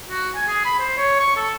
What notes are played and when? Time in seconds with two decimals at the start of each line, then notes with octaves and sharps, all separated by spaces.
0.09 F#4
0.35 G#5
0.48 G#4
0.65 B5
0.79 C5
0.97 C#5
1.20 C#6
1.37 A4